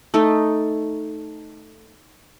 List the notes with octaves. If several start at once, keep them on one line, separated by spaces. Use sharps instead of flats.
A3 D#4 A4